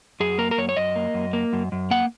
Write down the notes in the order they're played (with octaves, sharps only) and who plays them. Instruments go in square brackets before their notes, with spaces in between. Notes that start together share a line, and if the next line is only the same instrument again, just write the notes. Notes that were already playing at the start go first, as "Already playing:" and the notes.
[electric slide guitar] F#2 G#4
A#3 A#4
A#4
F#2 C#5
C#5
F#2 D#5
A#3
F#2
A#3
F#2
F#2
A#3 F#5